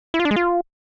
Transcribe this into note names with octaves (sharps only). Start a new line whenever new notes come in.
E4
F4
D4
G#3
F4